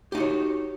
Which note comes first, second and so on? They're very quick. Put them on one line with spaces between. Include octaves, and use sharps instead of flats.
G4 D#4 F#4 C#5